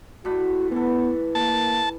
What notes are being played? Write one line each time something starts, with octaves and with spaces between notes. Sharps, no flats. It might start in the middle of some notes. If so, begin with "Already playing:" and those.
A2 D4 F#4 B5
E3 B3 A4
A#3 A5